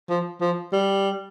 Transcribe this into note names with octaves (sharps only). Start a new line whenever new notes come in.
F3
F3
G3